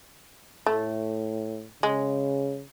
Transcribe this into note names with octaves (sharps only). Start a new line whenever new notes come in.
A2 A3
C#3 G#3